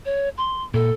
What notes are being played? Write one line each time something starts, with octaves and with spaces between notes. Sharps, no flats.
C#5
C6
A#2 A4